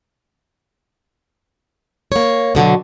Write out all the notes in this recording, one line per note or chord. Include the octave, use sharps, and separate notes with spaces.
A#3 C#5
B2 D3 F3 F#3